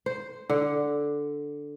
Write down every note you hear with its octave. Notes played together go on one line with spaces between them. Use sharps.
C5
D3